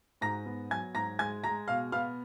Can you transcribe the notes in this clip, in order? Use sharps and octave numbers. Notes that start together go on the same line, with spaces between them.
G#2 A#5 A#6
B3
F#3 G#5 G#6
G#2 A#5 A#6
G#3 G#5 G#6
G#3 A#5 A#6
B2 F5 F6
B3 F5 F6